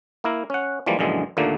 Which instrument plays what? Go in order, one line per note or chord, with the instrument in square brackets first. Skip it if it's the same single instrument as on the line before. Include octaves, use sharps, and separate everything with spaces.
[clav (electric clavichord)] A#3 E4 A#4
C#4 F#5
E3 F3 G3 G#3 A#3
A#1 F#2 D3 E3 G#3
D#2 A#2 D3 A3 A#3